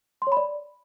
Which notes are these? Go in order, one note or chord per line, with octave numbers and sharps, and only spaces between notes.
C6
C#5
B5
D5